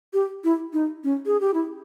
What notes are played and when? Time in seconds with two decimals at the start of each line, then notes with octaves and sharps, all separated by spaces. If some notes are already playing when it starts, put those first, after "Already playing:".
0.13 G4
0.44 E4
0.73 D#4
1.04 C#4
1.26 G#4
1.41 G4
1.54 E4